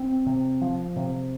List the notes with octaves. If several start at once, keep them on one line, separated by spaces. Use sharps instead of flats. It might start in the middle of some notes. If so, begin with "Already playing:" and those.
Already playing: C4
C3
F3
C3